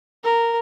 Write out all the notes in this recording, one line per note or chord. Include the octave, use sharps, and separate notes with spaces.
A#4